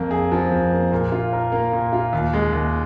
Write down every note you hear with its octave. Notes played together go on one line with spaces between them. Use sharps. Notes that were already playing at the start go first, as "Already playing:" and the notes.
Already playing: F2 A#3
G#4
F3
F2
A#3
A#2
F4
A#4
A#3
A#2
F4
D#2
G#3
D#2